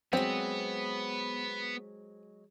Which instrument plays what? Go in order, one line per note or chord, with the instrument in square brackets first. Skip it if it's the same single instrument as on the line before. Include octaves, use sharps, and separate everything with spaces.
[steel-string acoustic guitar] F#3 G#3 [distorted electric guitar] B3 [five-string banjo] C4